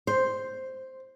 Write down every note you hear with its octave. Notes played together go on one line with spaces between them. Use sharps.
C5